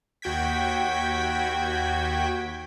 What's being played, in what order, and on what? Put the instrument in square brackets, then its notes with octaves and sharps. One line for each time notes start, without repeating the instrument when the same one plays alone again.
[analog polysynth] D#2 F#4 G5 G#6 B6